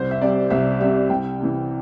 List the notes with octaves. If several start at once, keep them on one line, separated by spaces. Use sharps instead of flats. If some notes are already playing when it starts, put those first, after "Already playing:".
Already playing: C2 C5
E5
C3 G3 D5
C2 E5
C3 G3 E5
C2 G5
C3 E3